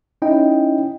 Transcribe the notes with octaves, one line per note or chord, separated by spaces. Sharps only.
C#4 D#4 E4 D#5 G5